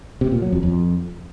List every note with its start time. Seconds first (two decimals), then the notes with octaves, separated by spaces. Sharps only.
0.21 C3
0.32 A#2
0.42 F#3
0.52 F2
0.63 F2